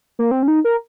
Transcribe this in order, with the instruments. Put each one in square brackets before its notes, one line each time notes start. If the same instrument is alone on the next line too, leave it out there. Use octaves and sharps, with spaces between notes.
[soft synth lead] A#3
C4
C#4
D#4
A#4